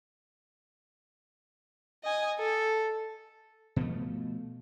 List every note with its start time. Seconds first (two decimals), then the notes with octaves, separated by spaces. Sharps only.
2.04 D#5 G#5
2.39 A4
3.76 B2 F3 A3